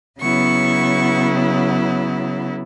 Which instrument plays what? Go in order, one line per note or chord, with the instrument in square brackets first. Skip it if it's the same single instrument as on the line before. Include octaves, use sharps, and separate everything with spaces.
[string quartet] C#3 F#3 B3 E4 C#6